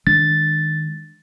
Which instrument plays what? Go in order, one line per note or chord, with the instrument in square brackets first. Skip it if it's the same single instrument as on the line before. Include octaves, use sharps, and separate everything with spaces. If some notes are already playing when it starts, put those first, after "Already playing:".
[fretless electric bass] D#3 G#3 D4 [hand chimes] A6